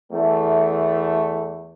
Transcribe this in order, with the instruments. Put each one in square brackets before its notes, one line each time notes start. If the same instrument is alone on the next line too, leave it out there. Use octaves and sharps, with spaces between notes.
[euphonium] E2 [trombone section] A3